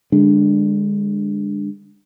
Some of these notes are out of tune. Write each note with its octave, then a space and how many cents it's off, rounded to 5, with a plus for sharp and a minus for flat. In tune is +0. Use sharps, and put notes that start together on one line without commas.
D3 +5 G#3 -30 D4 +0